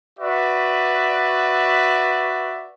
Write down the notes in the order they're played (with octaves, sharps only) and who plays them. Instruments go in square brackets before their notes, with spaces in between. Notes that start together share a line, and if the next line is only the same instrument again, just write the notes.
[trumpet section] F#4 B4 D5 E5